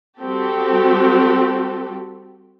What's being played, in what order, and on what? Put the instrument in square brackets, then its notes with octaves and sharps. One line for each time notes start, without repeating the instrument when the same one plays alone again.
[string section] G3 C4 F#4 G4 A4